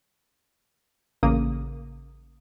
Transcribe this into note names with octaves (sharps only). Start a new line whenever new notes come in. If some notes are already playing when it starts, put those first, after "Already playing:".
A1 C#3 A#3 D#6